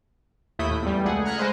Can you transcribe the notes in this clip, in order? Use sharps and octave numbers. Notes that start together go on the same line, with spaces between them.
D#2 A3 E4 D#6 G6 B6
A2
E2 G3
C#2 A3 G#4 F#5
A#5 F6 F#6 G#6 B6
G#3 B4 C5 D#5